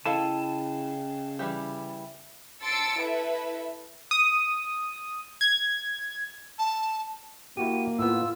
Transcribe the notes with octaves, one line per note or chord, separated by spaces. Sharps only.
C#3 E4 A4 D#5 F5 G5 A5
E3 G3 G4 E5
A5 C6 E6 A6 C#7 D7
E4 A4 B4 E5
D#6
G#6
A5
A#3 E4 F#4 G4 D#7
A2 B3 F4 E6